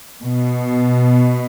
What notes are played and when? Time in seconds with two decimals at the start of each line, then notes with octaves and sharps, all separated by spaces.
0.23 B2